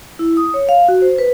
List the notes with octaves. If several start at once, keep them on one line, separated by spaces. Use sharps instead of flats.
E4
D#6
C#5
F5
F#4
C5
B4